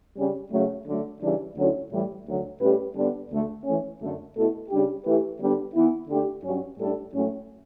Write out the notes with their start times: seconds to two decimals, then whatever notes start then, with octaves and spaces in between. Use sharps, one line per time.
0.17 C#3 G3 C#4
0.52 C#3 F#3 A3
0.86 D3 F#3 A3
1.22 C#3 E3 G3 D4
1.56 D2 D3 F#3 C#4 E4
1.92 A2 E3 G3
2.26 D2 D3 F#3
2.61 A2 G3 C#4 G4 B4
2.95 D3 G3 B3 D4
3.31 D2 D3 A3
3.65 E3 A3 C#4
4.01 F#2 D3 A3
4.35 B2 A3 E4 A4
4.70 C#3 G3 D4 G4
5.05 E3 A3 E4 G4 B4
5.41 D3 G3 B3 D4
5.75 E3 B3 E4
6.09 D3 A3 D4 G4
6.44 G2 F#3 C#4
6.79 A2 G3 D4 A4
7.14 A2 F#3 A3 C#4